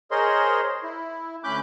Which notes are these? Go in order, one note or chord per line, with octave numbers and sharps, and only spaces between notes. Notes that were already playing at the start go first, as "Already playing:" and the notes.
G#4 A#4 C5 C#5 D#5 C6
E4
D2 C#4 B5 D6 F#6 G6